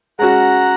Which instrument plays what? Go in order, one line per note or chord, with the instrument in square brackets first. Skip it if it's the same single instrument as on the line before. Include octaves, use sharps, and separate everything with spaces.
[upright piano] G#3 C#4 F#4 [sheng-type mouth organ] F#5 A#5